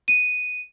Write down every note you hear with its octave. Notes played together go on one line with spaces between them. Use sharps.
D#7